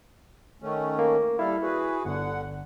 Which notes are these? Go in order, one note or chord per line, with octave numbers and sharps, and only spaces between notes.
D#3 A3 C#4
A#3
G3 E4 A4 F5
F#4 G#4 B4
G1 D3 F#5